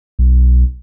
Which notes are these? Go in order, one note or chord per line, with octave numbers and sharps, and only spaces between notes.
B1